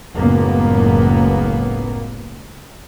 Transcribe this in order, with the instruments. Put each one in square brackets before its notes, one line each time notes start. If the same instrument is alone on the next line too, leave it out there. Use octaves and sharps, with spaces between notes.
[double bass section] F#1 C#2 A2 A#3 B3